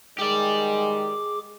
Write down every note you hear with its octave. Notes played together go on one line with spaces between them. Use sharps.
D#3 G#3 G4 G#4 D5 D6